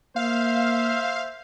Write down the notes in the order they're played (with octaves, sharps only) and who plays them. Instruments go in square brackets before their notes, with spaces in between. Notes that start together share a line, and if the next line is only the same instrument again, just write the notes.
[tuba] A#3 [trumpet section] C5 E5 [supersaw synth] F5